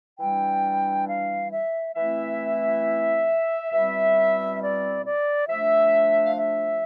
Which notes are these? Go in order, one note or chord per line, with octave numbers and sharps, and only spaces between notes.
E3 G3 D4 G5
F5
E5
E3 A3 C4 E4 E5
B2 G3 C4 E4 E5
D5
D5
F3 A3 D4 E5
F5
E5